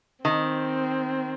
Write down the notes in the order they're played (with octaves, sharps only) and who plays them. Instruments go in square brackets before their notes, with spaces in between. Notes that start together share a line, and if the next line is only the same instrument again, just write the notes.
[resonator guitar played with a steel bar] D#3 [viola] C4